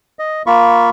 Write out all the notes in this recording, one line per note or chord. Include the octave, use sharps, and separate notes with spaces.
D#5
A#3 F4 B5 C#6